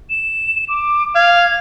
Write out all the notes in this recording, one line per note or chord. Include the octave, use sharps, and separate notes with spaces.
E7
D6
F5 G#6